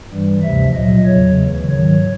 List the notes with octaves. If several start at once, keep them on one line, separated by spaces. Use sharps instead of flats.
G2 E3 G3
D2 C3 F3 E5
A#2 F#3 D#5
E2 C#3 F#3 C#5
D2 C#3 E3
G#2 D#3 F#3 C#5